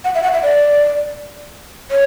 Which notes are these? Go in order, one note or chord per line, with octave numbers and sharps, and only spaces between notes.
F#5
E5
F#5
E5
D5
C#5